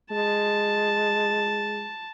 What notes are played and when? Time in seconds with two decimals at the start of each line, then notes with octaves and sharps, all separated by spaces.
0.11 G#3 A5